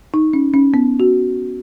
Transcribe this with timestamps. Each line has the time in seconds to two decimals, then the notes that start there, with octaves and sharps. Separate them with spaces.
0.14 D#4
0.33 C#4
0.54 C#4
0.74 B3
1.00 F#4